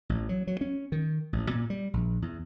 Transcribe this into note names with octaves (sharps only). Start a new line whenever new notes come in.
A1
F#3
F#3
C#4
D#3
A1
A#2
G3
A#1
E2